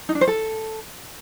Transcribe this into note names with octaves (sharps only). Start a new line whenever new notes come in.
D#4
D4
C5
A4